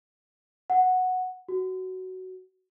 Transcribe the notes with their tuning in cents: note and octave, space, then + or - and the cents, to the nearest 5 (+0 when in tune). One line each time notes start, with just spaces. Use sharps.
F#5 -5
F#4 +10